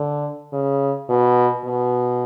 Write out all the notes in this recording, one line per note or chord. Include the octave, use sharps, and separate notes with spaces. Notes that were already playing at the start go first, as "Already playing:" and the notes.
Already playing: D3
C#3
B2
B2